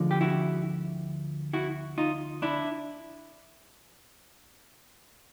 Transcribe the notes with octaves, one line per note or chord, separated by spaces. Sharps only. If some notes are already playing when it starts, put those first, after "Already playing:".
Already playing: D2 D3 F3 G#3
G4
E4 F#4
E4 F#4
D#4 F4
D4 E4